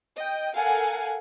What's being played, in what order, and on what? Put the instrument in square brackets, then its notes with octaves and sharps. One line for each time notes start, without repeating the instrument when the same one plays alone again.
[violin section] D#5 G5
A4 A#4 F5 F#5 G#5